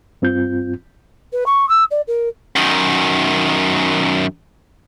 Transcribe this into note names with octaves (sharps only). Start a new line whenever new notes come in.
G2 C4 F4 G6
B4
C#6
E6
D5
A#4
F#2 D#3